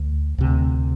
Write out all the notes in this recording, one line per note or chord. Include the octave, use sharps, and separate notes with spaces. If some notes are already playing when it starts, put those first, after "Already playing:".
Already playing: D2
D2 C3